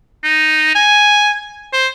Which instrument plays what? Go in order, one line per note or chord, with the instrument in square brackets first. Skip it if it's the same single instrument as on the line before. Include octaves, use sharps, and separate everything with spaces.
[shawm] D#4
G#5
C5